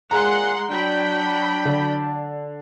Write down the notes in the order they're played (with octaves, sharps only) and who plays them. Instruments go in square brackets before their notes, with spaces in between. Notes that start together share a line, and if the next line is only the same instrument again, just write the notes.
[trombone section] G#1 A#2 G#4 [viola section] G#3 F#5 C6 [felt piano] A#5
[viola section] F#3 G5 B5 [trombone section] D4
[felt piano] D3